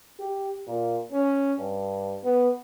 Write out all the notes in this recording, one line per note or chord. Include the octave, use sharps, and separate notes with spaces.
G4
A#2
C#4
G2
B3